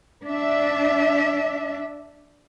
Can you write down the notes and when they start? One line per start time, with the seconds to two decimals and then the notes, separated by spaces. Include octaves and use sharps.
0.24 D4 E5